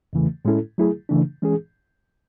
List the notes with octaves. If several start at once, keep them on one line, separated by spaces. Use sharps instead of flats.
E2 C#3 E3 A3
A2 G#3 C#4 E4 A4
F#3 A3 E4 G#4
C#3 E3 A3 D4
E3 G#3 C#4 G#4